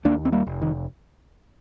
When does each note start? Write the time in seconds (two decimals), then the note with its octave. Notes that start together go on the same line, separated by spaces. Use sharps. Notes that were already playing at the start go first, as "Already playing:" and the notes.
0.05 D#2 A#3 D4
0.25 C4
0.32 G3 A#3
0.47 F1
0.62 D#3